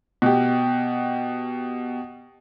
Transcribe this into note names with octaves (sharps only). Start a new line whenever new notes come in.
B2 G4